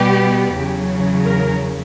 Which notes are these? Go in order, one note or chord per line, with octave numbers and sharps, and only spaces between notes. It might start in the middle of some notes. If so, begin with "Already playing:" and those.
Already playing: B2 G3 B3 G4
E2 C#3 F#3
A#4